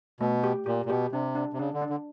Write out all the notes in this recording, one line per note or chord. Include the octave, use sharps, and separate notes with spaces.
B2 A3
G4
A#2 G4
A#2
B2 G4
C3 D4
D4
C3
C#3 D4
D3
D4
D3